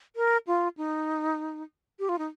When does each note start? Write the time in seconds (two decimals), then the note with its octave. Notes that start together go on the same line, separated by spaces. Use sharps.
0.16 A#4
0.47 F4
0.77 D#4
1.99 G4
2.09 F4
2.18 D#4